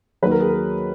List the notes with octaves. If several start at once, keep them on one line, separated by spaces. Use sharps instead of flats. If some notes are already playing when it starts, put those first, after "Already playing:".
D#2 D#3 F#3 B4
A#4
G#4
A#4